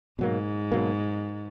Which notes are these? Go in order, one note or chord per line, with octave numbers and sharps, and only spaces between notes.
G#2 B2 F#3 A#3
B2 F#3 A#3